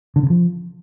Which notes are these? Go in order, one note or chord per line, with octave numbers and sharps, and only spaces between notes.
D3
C#3
F3